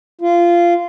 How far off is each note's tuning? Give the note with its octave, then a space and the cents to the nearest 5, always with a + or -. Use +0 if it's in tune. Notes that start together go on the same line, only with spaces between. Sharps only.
F4 -15